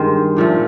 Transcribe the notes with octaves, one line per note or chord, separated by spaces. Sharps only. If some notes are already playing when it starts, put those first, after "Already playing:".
Already playing: G2 D#3 G#3 C5
A#2 F3 A3